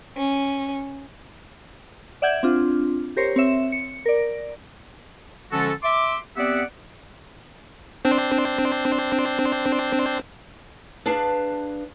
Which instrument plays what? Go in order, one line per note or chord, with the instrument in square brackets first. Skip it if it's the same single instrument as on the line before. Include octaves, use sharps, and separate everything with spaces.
[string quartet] C#4
[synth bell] D5 E5 F#5 G6 G#6
C4 D4 F4
G4 A#4 C5 C#5
C4 C#5 E5
C#7
A#4 D5
[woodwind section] D3 F3 G#3 C#4 F#4 A4
E5 C6 D6
B3 C4 G4 D5 E5 F#5
[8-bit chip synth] C4 D4 C5
[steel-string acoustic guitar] D4 G#4 B4 F5 A5